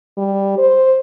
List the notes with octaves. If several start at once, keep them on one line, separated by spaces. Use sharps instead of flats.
G3
C5